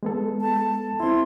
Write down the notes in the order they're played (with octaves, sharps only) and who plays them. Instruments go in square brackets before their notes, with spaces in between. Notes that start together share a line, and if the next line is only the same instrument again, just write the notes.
[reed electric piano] G#3 B3 A4
[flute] A5
[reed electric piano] C4 E4 [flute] C6